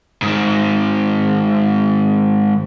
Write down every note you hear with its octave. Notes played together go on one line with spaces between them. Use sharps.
G#2 D#3